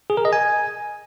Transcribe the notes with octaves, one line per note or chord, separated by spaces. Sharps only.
G#4
A#4
D#5
G#5